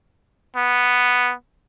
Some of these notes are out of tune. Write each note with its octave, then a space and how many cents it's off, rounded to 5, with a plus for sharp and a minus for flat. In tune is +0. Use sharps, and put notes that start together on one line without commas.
B3 +0